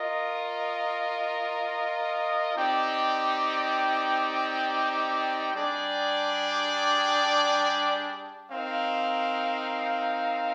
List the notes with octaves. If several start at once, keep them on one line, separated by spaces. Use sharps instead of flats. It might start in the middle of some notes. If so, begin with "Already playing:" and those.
Already playing: F4 A#4 D#5
C4 D#4 G4 D5 G5
G3 D4 G#4 D5 G5
C4 D#4 A#4 F5